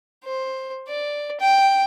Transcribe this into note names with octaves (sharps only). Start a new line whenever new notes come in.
C5
D5
G5